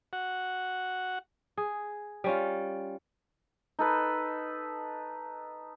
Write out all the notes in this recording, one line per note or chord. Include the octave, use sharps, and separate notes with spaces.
F#4 F#5
G#4
G3 C#4 F4
D#4 A4 B4